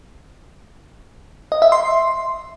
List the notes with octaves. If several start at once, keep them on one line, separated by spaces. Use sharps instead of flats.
D#5
E5
C6